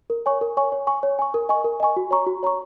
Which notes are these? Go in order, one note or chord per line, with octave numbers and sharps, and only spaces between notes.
A#4
C#5 G#5 C#6
A#4
C#5 G#5 C#6
C#5
G#5 C#6
C#5
G#5 C#6
A#4
D#5 G#5 C#6
A#4
D#5 G#5 C#6
F#4
C#5 A#5 C#6
F#4
C#5 A#5 C#6